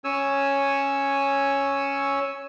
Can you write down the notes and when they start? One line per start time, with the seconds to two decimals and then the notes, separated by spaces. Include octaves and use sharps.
0.04 C#4 C#5 G#5 E6